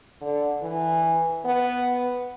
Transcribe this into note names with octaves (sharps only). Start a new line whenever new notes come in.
D3
E3
B3